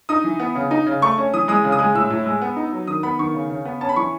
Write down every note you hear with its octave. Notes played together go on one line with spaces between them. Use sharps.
D#4 D#6
E3
B3
C#3
D#4
C#3
A3 C#6
C#4
E3 D#6
G#3 D#6
C#3
D#6
G#3
A2 E6
A2
G#3
B3
D#4
F#3
D#3 D#6
B3 B5
D#3 C#6
C#3
C#3
B3
C#4 A5
B5
E3 C#6